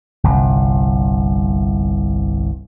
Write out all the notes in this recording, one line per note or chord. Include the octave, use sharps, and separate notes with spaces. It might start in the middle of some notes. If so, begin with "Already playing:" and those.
G1 C2